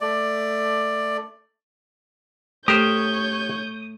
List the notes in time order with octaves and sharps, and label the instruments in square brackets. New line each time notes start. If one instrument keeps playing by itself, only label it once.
[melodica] A3 D5
[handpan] A3 [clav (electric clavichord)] G4 A#4 C5 [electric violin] C#5 G6 [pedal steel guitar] D#6